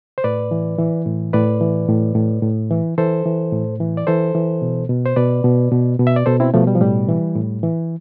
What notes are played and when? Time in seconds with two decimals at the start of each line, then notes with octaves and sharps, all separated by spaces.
0.18 C5
0.24 A2 B4 D5
0.51 E3
0.78 E3
1.06 A2
1.33 A2 B4 D5
1.61 E3
1.89 A2
2.15 A2
2.42 A2
2.70 E3
2.98 E3 A4 C5
3.25 E3
3.52 A2
3.80 E3
3.97 D5
4.07 E3 A4 C5
4.35 E3
4.62 B2
4.90 B2
5.06 C5
5.16 B2 B4 D5
5.44 B2
5.72 B2
5.99 B2
6.07 E5
6.16 D5
6.26 B2 A4 C5
6.40 C4 E4
6.54 B2 F3 A3
6.67 G3
6.75 F3
6.81 A2 G3
7.09 E3
7.36 A2
7.63 E3